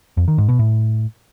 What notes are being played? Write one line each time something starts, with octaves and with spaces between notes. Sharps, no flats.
F2
D#3
G#2
B2
A2